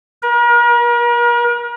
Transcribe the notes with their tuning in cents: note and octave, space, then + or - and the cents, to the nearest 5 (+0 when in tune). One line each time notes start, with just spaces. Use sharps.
A#4 +40